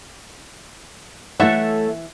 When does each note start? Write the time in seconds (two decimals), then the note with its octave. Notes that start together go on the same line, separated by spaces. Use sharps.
1.40 E3 A3 E4 A4 C#5 E5 F#5